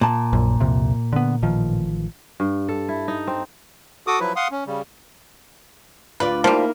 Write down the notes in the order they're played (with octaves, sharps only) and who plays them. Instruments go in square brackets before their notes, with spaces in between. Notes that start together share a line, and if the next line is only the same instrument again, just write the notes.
[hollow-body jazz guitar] A#2 A5
[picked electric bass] A#1 F#2
C2 F2 C3
D3 B3
A1 D#3 F3
[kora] G2
A4
E4
D#4
C4
[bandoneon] F#4 A4 D6 D#6
F3 F#3 E4 B4
F5 F#5 C6 D#6
C#4
C#3 G3
[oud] D2 F4 D5 [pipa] B4
[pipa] F3 G3 [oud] A#3 D#4 E4